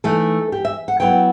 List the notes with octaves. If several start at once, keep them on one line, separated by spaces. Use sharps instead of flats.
E3 A3 D#4 A4
G4
E5
F#5
F#3 B3 E4 G5